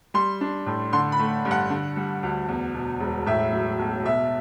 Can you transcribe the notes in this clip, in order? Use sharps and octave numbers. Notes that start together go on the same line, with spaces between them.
G3 C6
D4
A2
D3 C6
B5
A3
G2
F#5
D3
G3
D2
E2
B2
E1
A2 E5
F#3
B1
B2 E5